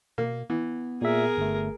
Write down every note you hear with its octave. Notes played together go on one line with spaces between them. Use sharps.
B2 A#3
E3 B3
A#2 G#4 A#4 E5
G1 A3